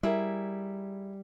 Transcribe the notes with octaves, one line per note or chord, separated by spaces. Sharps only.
G3 E4 G#4 A#4